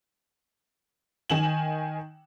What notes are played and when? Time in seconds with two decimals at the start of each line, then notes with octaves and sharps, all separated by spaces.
1.30 D#3 G#5 E7 F#7